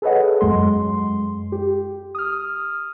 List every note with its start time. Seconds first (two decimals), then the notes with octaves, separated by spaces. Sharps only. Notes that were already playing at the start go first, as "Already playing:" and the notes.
0.02 G#4 A4 B4 C#5 D#5 F#5
0.41 F#2 G#3 C6
1.52 G4
2.15 D#6 F6